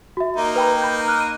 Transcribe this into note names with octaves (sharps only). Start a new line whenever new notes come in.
F#4 E5
A#3 D#4
B4 G5 B5
B5 G6
F6 F#6
D#7